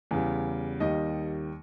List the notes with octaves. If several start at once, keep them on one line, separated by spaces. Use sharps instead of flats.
E2 C#3 G3
D#2 D#3 G3 D#5